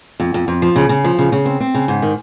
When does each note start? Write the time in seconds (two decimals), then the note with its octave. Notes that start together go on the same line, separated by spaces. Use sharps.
0.20 F2
0.34 F2
0.48 F2
0.62 F3
0.76 C#3
0.89 C#3
1.04 F3
1.19 C#3
1.32 C#3
1.45 C4
1.60 C4
1.74 C#3
1.88 G#2
2.02 D#3